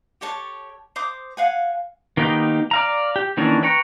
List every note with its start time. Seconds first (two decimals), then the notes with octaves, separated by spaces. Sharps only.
0.21 G4 A4 C#5 A5
0.96 C5 A#5 D6 D#6
1.37 F5 F#5 G#5
2.17 D#3 A#3 B3 D#4 G4
2.71 D5 F5 A#5
3.16 G4
3.37 D#3 E3 A#3 C#4 D4
3.63 B4 G5 A#5 C#6